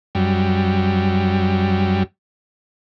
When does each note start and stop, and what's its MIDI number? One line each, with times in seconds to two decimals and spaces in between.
0.15 2.03 42
0.15 2.03 55